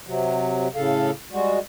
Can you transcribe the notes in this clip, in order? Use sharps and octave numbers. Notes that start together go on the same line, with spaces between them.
C3 F#3
A2 C#3 A4 F5
G3 G#3 F#4